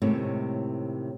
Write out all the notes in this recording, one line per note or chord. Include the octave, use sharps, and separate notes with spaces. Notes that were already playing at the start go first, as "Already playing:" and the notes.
A2 C3 D#3 G#3 C#4